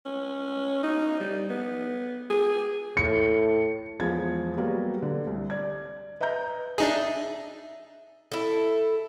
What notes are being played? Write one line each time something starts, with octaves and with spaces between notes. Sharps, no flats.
C#4
D#4
G3
B3
G#4
A2 C#7
E2 F3 G#3 G#6 A6
F#3 G3 A#3 B3
D3
C2
D5 G#6
B4 D#5 E5 A#5 G6
D4 D#4 G#4 E5
E4 A4